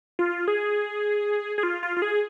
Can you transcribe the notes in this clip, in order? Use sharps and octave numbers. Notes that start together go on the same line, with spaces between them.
F4
G#4
G#4
F4
F4
F4
G#4